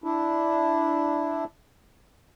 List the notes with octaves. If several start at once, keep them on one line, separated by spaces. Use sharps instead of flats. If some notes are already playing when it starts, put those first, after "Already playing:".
D4 E4